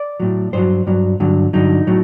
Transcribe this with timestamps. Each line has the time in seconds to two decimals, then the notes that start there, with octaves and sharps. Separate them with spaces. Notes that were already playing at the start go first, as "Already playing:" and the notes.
Already playing: D5
0.20 A2 F#3
0.53 G2 F#3 C5
0.87 G2 F#3
1.20 G2 D3 F#3
1.53 G2 D3 F#3 D#4
1.87 A2 F#3